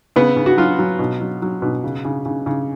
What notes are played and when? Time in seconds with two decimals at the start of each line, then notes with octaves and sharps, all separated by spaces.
0.16 C#3 B3
0.36 C#3
0.46 F#4
0.57 F#3 F4
0.79 F#3
0.99 B2
1.21 F#3
1.42 F#3
1.62 B2
1.84 C#3
2.05 C#3
2.25 C#3
2.46 C#3